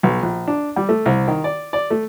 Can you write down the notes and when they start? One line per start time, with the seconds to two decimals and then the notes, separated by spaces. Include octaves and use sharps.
0.03 B1
0.22 A#1
0.48 D4
0.76 G3
0.89 A3
1.06 C2
1.28 D#3
1.44 D5
1.73 D5
1.90 A3